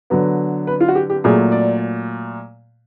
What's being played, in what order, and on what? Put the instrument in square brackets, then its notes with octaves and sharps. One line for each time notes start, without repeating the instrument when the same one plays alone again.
[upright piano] D3 F#3 B3
B4
F4
F#4
G4
G4
A#2 F#3 A3 G#4
D5